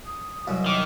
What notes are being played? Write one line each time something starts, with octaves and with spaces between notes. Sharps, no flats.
D#6
C2 F#2 B2
D#3 D6